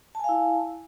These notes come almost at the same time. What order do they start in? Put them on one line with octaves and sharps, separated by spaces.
A5 G#5 F5 E4